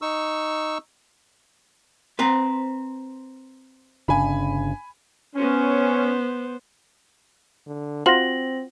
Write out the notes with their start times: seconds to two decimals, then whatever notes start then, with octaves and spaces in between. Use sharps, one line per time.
0.02 D#4 C#6 E6
2.19 C4 B4 C5 A#5
4.08 G1 C#3 D4 G#5 B5
5.36 B3 C#4 C5
7.66 D3
8.06 C4 F4 F#4 C5 A#6 F#7